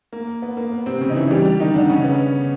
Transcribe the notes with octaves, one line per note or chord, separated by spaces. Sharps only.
A#3
B3
A#3
B3
C3 C4
C#3 C#4
D#4
E3 E4
G3 G4
G3 G4
D#3 D#4
D3 D4
C#3 C#4
B3